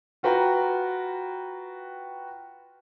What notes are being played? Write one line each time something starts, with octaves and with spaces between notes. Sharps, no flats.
F4 F#4 B4 G5 A#5